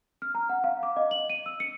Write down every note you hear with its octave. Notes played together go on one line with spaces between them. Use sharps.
F6
A#5
F#5
F5
D6
D#5
F#7
D#7
E6
C#7